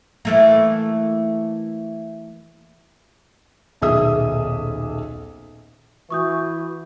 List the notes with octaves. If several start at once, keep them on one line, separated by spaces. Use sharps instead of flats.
E3 A3 A#3
D#1 B1 G#4 E5 D#6
E3 F#4 C#6 D#6 G6